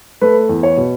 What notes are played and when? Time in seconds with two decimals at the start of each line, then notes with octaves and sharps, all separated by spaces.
0.21 A3 B4
0.49 E2
0.63 C#5
0.77 B2